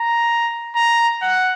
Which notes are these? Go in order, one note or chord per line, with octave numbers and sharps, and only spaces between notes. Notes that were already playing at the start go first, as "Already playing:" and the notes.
Already playing: A#5
A#5
F#5